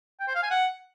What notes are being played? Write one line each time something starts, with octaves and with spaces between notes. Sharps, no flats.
G5
C5
F5
G#5
F#5